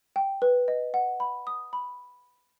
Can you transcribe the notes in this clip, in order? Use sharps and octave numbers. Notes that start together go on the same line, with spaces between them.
G5
B4
D#5
F#5
B5
D#6
B5